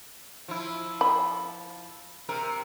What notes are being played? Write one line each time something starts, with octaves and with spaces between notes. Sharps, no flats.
F3 E4
B5
C3 A#4